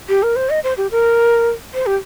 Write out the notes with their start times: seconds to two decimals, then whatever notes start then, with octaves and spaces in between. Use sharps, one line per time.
0.09 G4
0.23 A#4
0.36 C5
0.50 D#5
0.64 C5
0.77 G4
0.91 A#4
1.74 C5
1.86 G4